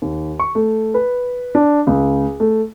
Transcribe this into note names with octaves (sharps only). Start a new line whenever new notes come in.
D#2
C#6
A3
B4
D4
C#2
A3